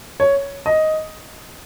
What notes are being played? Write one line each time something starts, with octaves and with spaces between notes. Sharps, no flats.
C#5
D#5